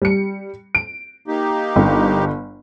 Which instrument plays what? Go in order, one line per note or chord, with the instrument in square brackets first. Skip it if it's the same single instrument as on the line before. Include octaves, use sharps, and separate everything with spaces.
[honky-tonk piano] G3 C#7
D7
[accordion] A#3 D#4 G4
[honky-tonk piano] G1